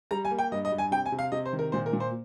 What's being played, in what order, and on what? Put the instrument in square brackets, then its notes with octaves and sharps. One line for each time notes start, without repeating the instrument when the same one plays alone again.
[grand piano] G3 A#5
G#5
A#3
G5
G2 D#5
D#5
G2
G#5
C3 G5
G#5
C3
F5
C3 D#5
C5
D#3
A#4
A#2 C5
A#4
A#2
C5